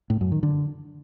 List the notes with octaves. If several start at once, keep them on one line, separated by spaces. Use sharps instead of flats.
A2
F#2
D#3
D3